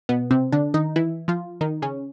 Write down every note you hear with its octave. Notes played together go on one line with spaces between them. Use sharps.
B2 B3
C3 C4
D3 D4
D#3 D#4
E3 E4
F3 F4
D#3 D#4
C#3 C#4